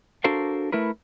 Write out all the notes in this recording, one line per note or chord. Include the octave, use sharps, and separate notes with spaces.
D4 F#4 A4 A#4 C5 F5
A3 E4 A#4 B4